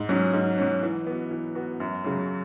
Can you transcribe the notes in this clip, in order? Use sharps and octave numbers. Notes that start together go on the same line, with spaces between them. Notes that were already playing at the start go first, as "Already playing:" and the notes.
Already playing: G#2
F#3 C#4
G#2
F#3 C#4
E3
B3 F#4
E3
B3 F#4
F#2
C#3 F#3